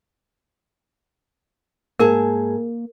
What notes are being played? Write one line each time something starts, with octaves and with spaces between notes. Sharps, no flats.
G#2 A#3 G#4 A#4 A5